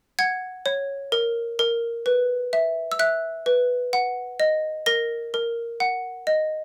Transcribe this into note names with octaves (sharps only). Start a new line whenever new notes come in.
F#5 G#6
C#5
A#4
A#4
B4
E5
E6
E5 F#6
B4
F#5
D#5
A#4 A#6
A#4
F#5
D#5